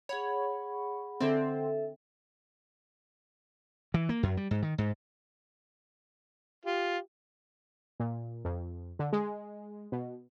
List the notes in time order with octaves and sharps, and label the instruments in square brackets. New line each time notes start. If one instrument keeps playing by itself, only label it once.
[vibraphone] G#4 F#5 B5 [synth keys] C#5
[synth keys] D3 C4 [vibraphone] A4 E5
[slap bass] E3
A#3
F#2
G3
G#2
D#3
G#2
[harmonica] F4 [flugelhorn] G4
[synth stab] A#2
F2
D3
G#3
B2